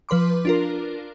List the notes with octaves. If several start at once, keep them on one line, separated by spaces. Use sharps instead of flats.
F3 B4 C6 D6
D4 F4 A#4